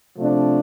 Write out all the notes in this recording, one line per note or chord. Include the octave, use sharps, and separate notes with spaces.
C3 F3 A3 D4